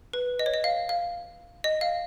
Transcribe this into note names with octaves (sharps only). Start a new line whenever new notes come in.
B4
D#5
C#5
D#5
F5
F5
D#5
F5